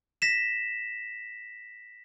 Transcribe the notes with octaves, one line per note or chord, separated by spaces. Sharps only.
A#6 B6 E7